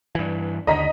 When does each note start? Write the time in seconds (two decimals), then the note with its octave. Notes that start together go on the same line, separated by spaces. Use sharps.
0.15 G2 E3
0.67 D#2 D3 D#5 A#5 B6